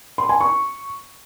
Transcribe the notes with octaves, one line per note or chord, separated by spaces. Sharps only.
C6
G#5
C#6